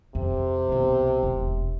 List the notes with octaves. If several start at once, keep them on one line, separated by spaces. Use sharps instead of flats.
F2 C3
C2 B2
E1